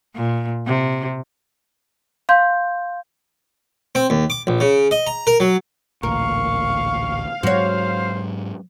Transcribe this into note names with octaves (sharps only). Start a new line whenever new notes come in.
A#2
C3
F5 C6 G6
C4
D#2
D6
A#1
C#3
D#5
A#5
A#4
F#3
A1 D2 A#2 A#4 F5 C#6
G#2 F#3 G#3 F#4 C5 C#5